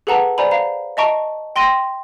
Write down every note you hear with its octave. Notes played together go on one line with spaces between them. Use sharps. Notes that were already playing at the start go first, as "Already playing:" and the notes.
G#4 A4 B4 F#5 A5 A#5
C5 D5 G#5 A#5 B5
F5 A#5
D#5 E5 A5 A#5 C#6 D7
G5 C6 A#6 D#7